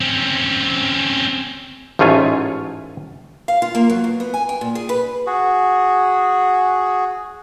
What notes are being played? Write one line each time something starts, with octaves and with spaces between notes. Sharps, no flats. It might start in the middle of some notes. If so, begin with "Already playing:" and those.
C4 C#4
A1 G#2 A3 F4 C#5 G#5
F5
F4
A#3
F#3
B2
B3
G#5
G5
A#2
G#4
B4
F#4 G#4